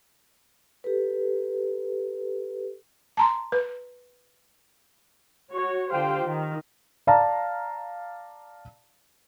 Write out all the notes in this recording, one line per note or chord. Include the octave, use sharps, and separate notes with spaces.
G4 A4 B4
A5 A#5 C6
B4
F#4 C#5
D3 F4 G4 C5 F5 G5
D#3
D5 F5 A5 A#5